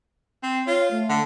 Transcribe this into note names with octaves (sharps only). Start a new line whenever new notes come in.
C4
F4 C#5
A3
D3